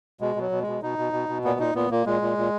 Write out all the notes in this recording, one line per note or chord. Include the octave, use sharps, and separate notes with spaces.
B2 G#3
B2 F#3
B2
G#3
B2
B2 D#4
B2
B2
B2
A#2 B3
A#2 D#4
A#2 B3
A#2 A#3
A#2 G#3
A#2
A#2